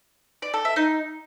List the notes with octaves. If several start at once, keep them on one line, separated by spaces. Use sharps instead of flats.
D5
A4
E5
D#4